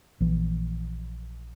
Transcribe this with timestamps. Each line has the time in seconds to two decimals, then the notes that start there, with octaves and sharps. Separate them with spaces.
0.20 A#1 E3